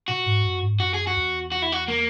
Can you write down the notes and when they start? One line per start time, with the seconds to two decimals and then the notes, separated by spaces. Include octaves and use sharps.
0.08 A#2 F#4
0.26 G#2
0.44 F#2
0.63 G#2
0.80 F#2 F#4
0.94 G#4
1.07 F#4
1.17 E2
1.52 F#4
1.62 E4
1.72 F#4
1.88 A#3